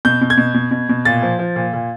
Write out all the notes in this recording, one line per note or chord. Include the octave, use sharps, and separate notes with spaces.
B2 G6
B2
G#6
B2
B2
B2
B2
A#2 A6
F3
F3
A#2
A#2